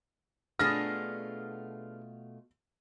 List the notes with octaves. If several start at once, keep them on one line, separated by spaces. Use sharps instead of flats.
B2 A3 B3 D4 F4 G#4 F6 A#6